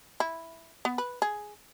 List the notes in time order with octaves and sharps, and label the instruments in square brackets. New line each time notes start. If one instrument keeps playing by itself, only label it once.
[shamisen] E4
B3
B4
G#4